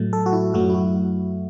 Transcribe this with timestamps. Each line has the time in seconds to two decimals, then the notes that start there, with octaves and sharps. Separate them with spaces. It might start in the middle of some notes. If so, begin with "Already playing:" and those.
Already playing: A2 F#3 A3
0.13 A4
0.26 F#4
0.33 E4
0.54 F#2 F#3 A3 F#4
0.70 E4
0.74 F#4